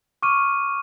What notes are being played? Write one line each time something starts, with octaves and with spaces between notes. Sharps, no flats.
C#6 D6 F6 D#7